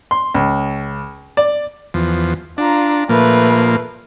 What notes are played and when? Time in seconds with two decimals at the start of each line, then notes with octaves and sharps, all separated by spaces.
0.11 C6
0.35 C#2
1.37 D5
1.94 E2 F3
2.58 D4 F4 A#5
3.09 A#2 F3 A3 A#3 B4